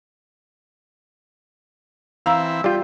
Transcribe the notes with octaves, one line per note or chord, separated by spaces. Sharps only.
E3 C4 E4 F5 A#5 E6
G3 F4 G4